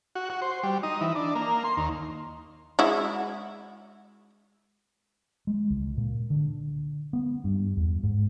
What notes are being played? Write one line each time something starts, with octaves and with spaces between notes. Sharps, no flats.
F#4
F#4
C5
G3
D#4
E3
D4
A#3
C6
D#2
G#3 E4 F#4
G#3
C#2
A#2
D3
B3
G2
E2
G#2